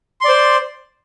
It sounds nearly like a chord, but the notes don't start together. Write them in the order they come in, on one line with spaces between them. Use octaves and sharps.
C6 D5 C5